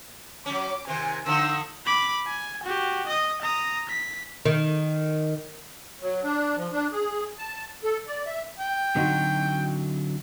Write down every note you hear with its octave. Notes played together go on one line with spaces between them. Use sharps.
F#3 C#4 D6
C3 D#3 C5 G#5
D3 F3 D#4 E6
B5 D6
G#5
F#4 G4
D#5 D#6
A#5 D#6
B6
D#3
F#3
D4
F3
D4
G#4
A5
A4
D5
E5
G5
D3 F#3 C4 D#4 F#4